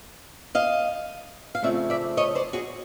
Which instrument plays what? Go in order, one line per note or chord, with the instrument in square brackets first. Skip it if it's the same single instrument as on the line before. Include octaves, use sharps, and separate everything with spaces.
[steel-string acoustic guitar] D#5 F5
F5
C#3 F3 A3 C4 D5 E5
D5 E5
C#5 D#5
C5 D5
F#4 G#4